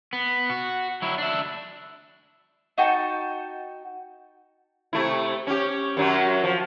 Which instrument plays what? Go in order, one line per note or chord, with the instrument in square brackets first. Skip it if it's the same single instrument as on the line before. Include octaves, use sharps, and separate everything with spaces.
[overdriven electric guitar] B3
F#4
F#3 E4
D4 E5
[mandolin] D#4 F#4 G5 A5
[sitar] C3 A3 E4
C#4 G4
F#2 F#3 C#4
F3